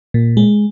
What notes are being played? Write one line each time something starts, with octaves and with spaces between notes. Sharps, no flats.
A#2
G#3